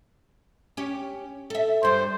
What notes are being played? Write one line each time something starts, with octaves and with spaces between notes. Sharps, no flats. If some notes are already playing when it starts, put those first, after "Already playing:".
C#4 G4
A4 E5
G2 G3 C5